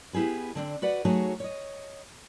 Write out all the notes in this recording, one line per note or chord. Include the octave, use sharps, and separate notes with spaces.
B3 E4 G4 G#4 B4
D3 C4 D4
F#4 B4 D5 F#5
F#3 A3 D#4 F#4 G#4 C#5
C#5 D#5